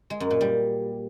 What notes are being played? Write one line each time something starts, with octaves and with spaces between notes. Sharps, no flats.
G#3
F#2
A#2
G3